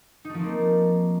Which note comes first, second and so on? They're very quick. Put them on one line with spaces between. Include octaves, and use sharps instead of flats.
D#4 A3 F3 C4 A#3